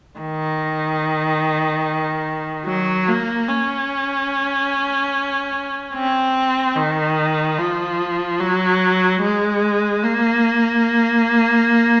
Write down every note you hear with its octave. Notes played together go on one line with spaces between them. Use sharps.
D#3
F#3
A#3
C#4
C4
D#3
F3
F#3
G#3
A#3